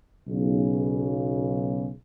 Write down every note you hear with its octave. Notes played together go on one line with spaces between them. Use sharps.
B1 C#3